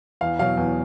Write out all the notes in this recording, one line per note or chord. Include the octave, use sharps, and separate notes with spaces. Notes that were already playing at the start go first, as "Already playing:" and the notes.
E2 F5
B2 F#3 F5
E2